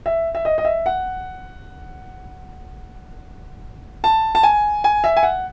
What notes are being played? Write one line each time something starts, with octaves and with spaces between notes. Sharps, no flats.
E5
E5
D#5
D#5
E5
F#5
A5
A5
G#5
G#5
E5
G#5
F#5